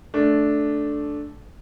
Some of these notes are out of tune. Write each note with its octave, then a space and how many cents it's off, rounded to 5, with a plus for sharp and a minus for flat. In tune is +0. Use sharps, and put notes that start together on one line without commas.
A3 -10 D4 -5